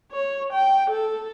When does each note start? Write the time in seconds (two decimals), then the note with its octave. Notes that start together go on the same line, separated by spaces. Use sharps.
0.12 C#5
0.53 G5
0.90 A4